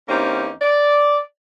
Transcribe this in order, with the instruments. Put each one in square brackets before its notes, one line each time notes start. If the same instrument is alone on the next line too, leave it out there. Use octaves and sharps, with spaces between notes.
[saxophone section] E2 A#3 C4 C#4 D#4 G4
D5